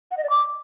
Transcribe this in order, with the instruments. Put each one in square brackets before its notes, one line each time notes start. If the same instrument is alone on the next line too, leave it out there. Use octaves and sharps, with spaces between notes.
[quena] F#5
D#5
D5
D6